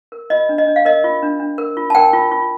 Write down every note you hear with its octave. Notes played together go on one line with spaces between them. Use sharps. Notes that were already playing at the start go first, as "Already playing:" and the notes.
A#4
F4 D#5
D4
D#5
D4
F5
A#4 D#5
F4
D4
D4
A#4
F4
A5
A#4 G5
F4
F4